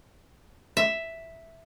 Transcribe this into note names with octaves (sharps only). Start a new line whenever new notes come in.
E5